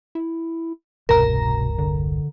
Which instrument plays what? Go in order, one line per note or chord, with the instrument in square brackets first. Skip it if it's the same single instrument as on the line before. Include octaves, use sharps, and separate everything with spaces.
[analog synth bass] E4
[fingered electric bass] E1 C2 G2 [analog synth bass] B2 [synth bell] A#4 A#5
[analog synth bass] D3